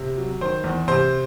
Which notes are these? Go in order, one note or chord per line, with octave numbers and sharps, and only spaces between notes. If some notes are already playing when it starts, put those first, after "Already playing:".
Already playing: C3
F#3
D#3 C5
E2
C3 C5